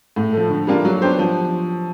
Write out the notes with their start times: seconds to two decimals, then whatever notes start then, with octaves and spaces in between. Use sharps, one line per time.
0.16 A2
0.33 F3 A3
0.50 D3
0.67 G3 A#3 D4 F4
0.85 F#3
1.02 B3 D4 G4 C5
1.19 F3